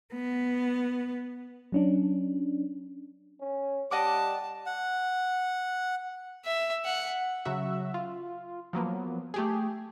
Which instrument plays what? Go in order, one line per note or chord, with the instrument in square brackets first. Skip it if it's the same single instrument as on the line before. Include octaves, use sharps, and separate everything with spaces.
[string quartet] B3
[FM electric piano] F#3 C#4 D4
[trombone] C#4
[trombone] G3 [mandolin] D#5 F#5 D6 [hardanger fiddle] A5
[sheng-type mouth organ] F#5
[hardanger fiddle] E5
F#5
[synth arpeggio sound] C#3 F#3 F#4 E5
F4
F3 F#3 A#3 B3
A3 G4 G#4